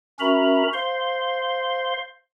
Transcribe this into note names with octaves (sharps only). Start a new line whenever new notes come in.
C#4 F#4 A#4 E5 A#5 B5
C5 F5 C6